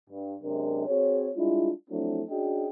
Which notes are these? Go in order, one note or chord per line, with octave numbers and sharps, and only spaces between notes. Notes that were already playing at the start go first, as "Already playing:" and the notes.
G2
F#2 C3 G#3 D4 A#4
C4 F#4 G#4 C#5
G3 G#3 D4 E4 F4
F3 F#3 A3 C4 D4 E4
C#4 D4 F#4 G#4 D#5 G5